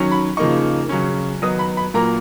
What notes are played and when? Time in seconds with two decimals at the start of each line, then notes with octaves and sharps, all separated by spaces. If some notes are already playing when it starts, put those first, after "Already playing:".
Already playing: D#3 F#3 C#4
0.11 B5
0.37 C#3 F3 A#3 D#4 C#6
0.89 C#3 F#3 C#4
1.42 D#3 F#3 B3 D#4 D#6
1.59 B5
1.77 B5
1.94 A#2 F#3 A#3 A#5